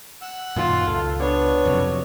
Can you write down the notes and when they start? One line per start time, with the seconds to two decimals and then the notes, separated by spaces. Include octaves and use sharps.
0.22 F#5 E6 F#6
0.56 F#2 A#2 D#3 F4
0.87 C#2 A4 F5
1.20 B3 D4 C#5
1.65 F2 C3 F#3